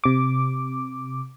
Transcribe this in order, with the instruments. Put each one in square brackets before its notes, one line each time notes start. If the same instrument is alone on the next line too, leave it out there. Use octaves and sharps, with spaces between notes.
[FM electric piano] C3 D6